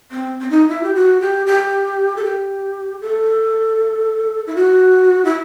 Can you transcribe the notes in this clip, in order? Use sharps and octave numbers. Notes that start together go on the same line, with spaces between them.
C4
C4
D#4
E4
G4
F#4
G4
G4
A4
G4
A4
E4
F#4
E4